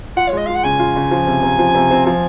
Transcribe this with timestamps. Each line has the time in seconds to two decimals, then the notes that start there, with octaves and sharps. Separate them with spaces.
0.16 F4 F#5
0.28 C#5
0.32 G#3 D#5
0.46 F4 F5
0.55 F#5
0.64 C#3 G#5
0.79 F4
0.96 C#3
1.11 F3
1.27 C3
1.43 C3
1.59 F3
1.74 C3
1.91 C4
2.06 F3 G#5